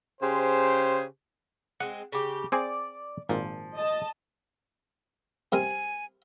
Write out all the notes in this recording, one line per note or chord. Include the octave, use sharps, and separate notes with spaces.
C#3 G4 G#4 C5
G#3 C4 F#5
C#3 G4
C4 G#4 D5 G#5
G#1 A#2 F3
D#5 A5
C3 G3 A#4 G#5